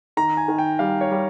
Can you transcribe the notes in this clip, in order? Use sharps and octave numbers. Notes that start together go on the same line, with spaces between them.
D#3 A#5
G#5
D#3
G5
G3 F5
C#5
G3